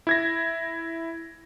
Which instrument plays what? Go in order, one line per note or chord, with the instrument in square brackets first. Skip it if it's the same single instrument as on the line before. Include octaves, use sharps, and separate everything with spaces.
[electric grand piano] E4 G#6 A#6